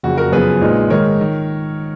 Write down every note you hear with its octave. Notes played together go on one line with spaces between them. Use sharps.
F#1 F2 C#3 F#4
F#4 A#4
F#2 C#3 F3 B3 G#4 B4
A#1 A#2 G#3 D#4
G#2 D#3 G#3 D#4 A#4 C#5
D#3